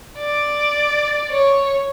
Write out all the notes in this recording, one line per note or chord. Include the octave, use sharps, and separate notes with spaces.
D5
C#5